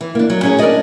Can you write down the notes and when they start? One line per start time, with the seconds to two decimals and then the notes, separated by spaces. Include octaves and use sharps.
0.01 E3
0.15 A#3 D4
0.30 F#3
0.43 C#4 F#4 G#4 C#5
0.59 D4 A#4 D5 D#5